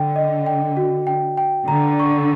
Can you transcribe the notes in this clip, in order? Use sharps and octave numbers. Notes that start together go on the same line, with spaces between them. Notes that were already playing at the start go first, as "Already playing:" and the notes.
Already playing: D3 G5
D#5
G5
F#4
G5
G5
D3 A#5
C#6